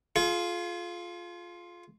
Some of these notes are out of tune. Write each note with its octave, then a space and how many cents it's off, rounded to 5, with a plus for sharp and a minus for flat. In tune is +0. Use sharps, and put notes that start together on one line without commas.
F4 +0 G#4 +45